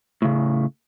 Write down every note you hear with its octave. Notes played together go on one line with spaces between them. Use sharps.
A2 C#3